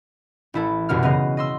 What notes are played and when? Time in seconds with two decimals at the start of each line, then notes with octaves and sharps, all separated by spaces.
0.54 A1 E4 A4
0.89 F1 C2 F#2 B2 F#4 F6
1.03 C#3 F#3 B3 D#5 F5
1.37 D#5 C6 E6